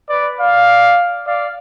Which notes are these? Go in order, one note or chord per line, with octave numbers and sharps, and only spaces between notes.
B4 D5
D5 F5
D5 F5